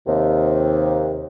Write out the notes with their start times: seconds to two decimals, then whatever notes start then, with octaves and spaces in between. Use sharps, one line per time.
0.07 D#2 C3